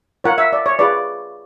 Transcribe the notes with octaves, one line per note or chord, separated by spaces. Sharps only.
F4 A#4 C#5 F#5
E5
D5
C#5
F4 G#4 B4 D5